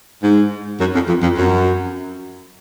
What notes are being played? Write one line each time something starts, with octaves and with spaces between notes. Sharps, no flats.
G#2
F#2
F2
F2
F2
F#2